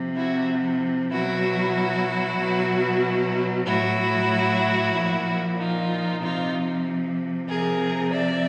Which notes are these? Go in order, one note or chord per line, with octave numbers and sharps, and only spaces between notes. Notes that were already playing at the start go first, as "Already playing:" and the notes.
Already playing: C3 F3
E4 F#4
B2 F#3 E4 F#4
B2 F#3
A2 F#3 E4 F#4
A#2 F3
D#4 F4
C3 F3 D#4 F4
C3 F3 G#4 A#4
D5 E5